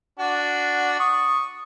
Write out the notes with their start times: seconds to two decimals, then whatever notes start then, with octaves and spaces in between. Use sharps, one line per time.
0.19 D4 F#4
1.00 C#6 D#6